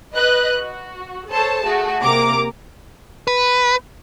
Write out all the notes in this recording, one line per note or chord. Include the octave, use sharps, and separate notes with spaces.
B4 D#5 F#6
F#4
A4 C5 C#5 A5
A3 F#4 G#4
C3 A#3 A#5 D6
B4